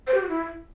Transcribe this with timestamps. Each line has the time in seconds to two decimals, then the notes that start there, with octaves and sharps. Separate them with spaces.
0.07 C5
0.14 G4
0.22 F#4
0.29 E4